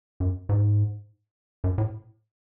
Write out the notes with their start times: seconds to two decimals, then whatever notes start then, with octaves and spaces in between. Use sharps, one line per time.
0.20 F#2
0.49 G#2
1.64 F#2
1.78 A2